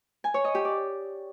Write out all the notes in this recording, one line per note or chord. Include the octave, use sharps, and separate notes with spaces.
G#5
C#5
D#5
G4
D5